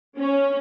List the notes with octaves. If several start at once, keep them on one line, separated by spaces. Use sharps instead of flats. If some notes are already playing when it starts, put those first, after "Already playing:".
C#4